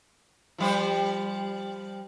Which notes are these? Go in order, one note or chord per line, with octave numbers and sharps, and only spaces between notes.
F3 G3 C5